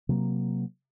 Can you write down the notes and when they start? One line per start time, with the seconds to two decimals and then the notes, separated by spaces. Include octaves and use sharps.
0.09 C3 F#3 A#3